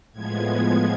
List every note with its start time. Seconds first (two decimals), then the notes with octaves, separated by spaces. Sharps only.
0.12 A2 F3 G#3 B3 G#6
0.48 G#6